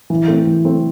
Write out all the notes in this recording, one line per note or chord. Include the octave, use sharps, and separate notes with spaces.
E3
A3 C4
E3
A3 C4